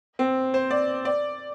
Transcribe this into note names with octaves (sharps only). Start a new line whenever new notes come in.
C4
C5
D5
D5